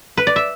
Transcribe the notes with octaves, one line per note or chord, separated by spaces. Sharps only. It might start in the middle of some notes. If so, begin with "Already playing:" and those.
B4
D5
E5